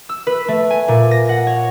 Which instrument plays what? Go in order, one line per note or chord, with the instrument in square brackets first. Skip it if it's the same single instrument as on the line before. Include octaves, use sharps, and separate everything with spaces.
[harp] E6
B4
A3
G#5
A#2
A#6
F#5
C#5